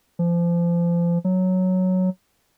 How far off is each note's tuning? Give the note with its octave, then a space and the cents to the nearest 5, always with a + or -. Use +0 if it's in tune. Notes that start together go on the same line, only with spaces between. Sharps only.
F3 -30
F#3 +0